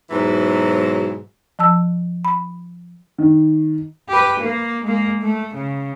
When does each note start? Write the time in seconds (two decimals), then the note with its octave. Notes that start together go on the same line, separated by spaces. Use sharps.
0.10 G#2 B2 E3 F#3
1.59 F3 A5 E6
2.25 B5
3.18 D#3
4.08 G4 B4
4.40 A#3
4.84 G#3 A#3
5.22 A3
5.55 C#3